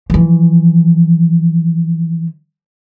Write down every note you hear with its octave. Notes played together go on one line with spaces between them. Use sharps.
E3 F3